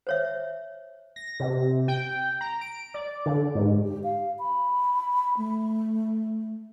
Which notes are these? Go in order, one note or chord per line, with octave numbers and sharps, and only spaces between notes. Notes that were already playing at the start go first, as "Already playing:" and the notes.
C5 C#5 E5
A#6
C3
G5
A#5
D7
D5
D3
G#2
G4
F5
B5
A3